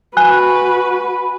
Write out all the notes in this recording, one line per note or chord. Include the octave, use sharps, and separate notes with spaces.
F#4 B4 G#5 F#6